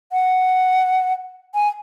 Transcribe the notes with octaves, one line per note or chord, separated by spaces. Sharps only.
F#5
G#5